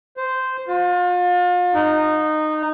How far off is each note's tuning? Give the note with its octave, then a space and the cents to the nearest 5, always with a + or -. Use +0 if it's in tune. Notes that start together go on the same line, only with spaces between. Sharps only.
C5 -10
F4 +35
D#4 -15